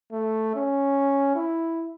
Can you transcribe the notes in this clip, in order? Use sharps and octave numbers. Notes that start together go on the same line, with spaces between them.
A3
C#4
E4